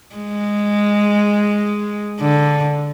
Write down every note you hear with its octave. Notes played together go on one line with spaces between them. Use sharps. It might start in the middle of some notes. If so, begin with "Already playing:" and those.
G#3
D3